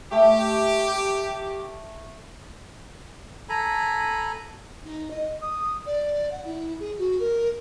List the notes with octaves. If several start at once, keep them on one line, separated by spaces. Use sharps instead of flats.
A3 G4
A4 G#5 A#5 B5
D#4
D#5
D#6
D5
F#5
E4
G#4
F#4
A#4